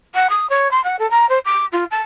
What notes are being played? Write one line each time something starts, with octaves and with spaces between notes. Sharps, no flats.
F#5
D#6
C#5
C6
F#5
A4
A#5
C5
D6
F4
A5